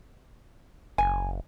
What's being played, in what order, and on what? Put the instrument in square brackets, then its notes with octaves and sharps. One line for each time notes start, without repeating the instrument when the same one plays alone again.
[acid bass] F#1 [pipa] G#5